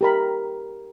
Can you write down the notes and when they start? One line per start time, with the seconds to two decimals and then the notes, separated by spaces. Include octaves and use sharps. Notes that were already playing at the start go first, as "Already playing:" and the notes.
0.01 G4 A#4 B5